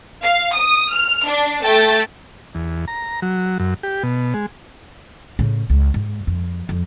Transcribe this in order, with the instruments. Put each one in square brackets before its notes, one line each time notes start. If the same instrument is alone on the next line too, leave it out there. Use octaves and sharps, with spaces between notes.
[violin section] F5
D#6
F6
D4
A3 G5 A5 A6
[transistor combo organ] E2
A#5
F#3
F#2
G4
B2
G#3
[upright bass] A2 C#3
C#2
G#2
F2
F2